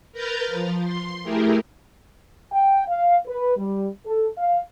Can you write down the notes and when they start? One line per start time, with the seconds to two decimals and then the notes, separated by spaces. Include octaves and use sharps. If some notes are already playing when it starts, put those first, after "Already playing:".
0.13 A#4 B4 A#5 F6 G6 A6
0.48 F3
0.83 C6
1.24 A3 E4 G4 G#4 A#4
2.52 G5
2.88 F5
3.27 B4
3.58 G3
4.06 A4
4.38 F5